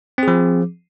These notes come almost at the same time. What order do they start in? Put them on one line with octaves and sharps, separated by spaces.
C4 G#4 F3